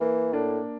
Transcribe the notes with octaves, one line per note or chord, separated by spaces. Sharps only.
E3 A#3
A2 A#3 D4